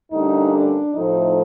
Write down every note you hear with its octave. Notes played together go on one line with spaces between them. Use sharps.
D2 D3 G3 A#3 C#4 D#4
D4
A2 F3 A3 C4 D#4